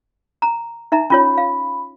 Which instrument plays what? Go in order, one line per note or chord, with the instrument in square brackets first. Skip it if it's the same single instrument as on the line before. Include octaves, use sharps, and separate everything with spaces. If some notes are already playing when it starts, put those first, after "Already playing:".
[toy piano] A#5
D#4 E5 A#5
[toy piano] C#4 F4 C#5 [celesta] B5
[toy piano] F5